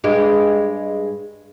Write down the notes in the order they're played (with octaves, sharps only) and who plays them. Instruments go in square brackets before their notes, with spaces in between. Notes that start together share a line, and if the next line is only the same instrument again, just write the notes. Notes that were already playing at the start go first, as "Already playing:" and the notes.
[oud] G2 G#3 G4